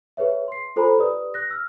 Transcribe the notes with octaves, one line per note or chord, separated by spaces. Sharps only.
G#4 B4 C#5 E5
C6 C7
F4 A4 C5 G#5 A#5 B5
G4 B4 D5 D#6
F#6 A#6
E6 F6